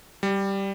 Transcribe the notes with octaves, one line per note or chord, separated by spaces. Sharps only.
G3